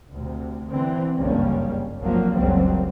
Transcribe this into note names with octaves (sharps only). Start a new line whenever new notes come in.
D2 C3
D3 E3 C4
F#1 C#2 G2 G3 A#3 C#4
G1 C2 F3 F#3 A#3
F#1 C#2 C#3 F#3 G3 C4